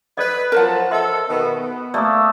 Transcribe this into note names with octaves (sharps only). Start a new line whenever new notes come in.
A4 B4 D5 D#5
F3 F#3 A#4 C5 F#5 A5
A4 D#5 E5 C6
B2 D#3 B3
B3
A3 A#3 D5 D#6